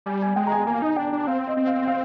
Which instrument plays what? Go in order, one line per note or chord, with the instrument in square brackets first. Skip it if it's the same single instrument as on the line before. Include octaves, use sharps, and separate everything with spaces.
[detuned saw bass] G3 [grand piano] G#5
[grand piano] G#5
[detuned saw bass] G#3 [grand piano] G5
[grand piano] A#5
G#5
[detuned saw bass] A#3 [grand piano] G#5
[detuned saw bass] D#4
[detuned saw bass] D4 [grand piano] G5
[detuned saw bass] D4
[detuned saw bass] C4 [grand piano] F5
[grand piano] D#5
[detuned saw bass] C4
[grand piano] F5
F5